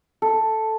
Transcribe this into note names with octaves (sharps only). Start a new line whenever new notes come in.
A4